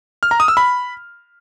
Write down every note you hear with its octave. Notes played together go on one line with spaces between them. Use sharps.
F6
A#5
D#6
E6
B5